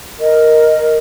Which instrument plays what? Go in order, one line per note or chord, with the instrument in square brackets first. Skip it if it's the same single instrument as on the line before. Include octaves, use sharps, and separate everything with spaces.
[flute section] A#4 D#5